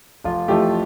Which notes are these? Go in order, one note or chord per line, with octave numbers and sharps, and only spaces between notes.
F1 F4
F2 E3 A3 G4